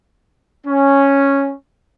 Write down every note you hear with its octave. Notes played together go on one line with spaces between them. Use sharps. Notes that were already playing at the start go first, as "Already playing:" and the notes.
C#4